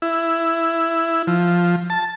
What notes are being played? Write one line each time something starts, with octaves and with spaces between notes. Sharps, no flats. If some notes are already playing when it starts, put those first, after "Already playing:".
E4
F3
A5